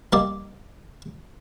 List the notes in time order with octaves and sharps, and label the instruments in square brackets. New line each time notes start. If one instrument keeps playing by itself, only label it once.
[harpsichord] G3 A#3 D5 D#5